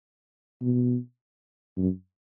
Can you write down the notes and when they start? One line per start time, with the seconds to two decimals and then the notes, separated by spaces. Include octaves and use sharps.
0.61 B2
1.77 F#2